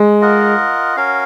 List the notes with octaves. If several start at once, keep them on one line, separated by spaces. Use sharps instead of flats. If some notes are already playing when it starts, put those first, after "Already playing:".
Already playing: G#3
F4 A#4 D#5 F#5
C#4 F#4 A#4 F5